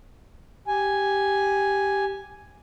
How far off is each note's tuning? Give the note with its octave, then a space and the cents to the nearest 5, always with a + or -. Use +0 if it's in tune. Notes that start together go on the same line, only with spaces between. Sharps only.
G4 +0 G#5 +0